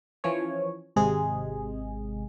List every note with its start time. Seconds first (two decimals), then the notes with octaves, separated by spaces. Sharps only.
0.24 E3 F3 C#4 C#5
0.96 G#1 C3 G#3 G#4